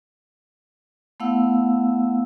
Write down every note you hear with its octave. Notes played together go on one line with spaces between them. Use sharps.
A3 B3 E4 F5 F#5 E6